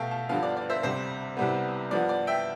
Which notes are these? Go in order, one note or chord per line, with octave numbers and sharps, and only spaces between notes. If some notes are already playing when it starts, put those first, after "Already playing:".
Already playing: B2 A3 E5 F5 G5 A5
F5 A5
G2 D3 F3 B3 F5 A5
D5
D5
C5 E5
D2 C3 G3 C5
C2 C3 G3 B3
G2 F3 B3 D5
D5
E5 G5